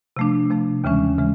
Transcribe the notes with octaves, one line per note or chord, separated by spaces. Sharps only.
C3 F3 A3 D4
C3 F3 A3 D4
D#2 C#3 E3 G#3 C#4
C#3 E3 G#3